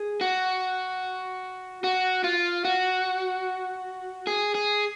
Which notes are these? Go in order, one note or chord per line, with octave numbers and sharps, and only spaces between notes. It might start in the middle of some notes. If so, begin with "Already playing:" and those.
Already playing: G#4
F#4
F#4
F4
F#4
G#4
G#4